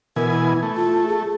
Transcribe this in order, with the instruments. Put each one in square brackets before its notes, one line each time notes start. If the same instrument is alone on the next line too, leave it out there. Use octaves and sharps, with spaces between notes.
[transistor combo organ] B2 E3 G#5 [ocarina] A#4
[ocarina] E4
[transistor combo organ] A3
[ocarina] F4
G#4